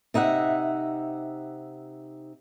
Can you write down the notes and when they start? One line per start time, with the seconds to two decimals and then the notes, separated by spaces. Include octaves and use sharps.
0.14 C3 D#4 E5 F#5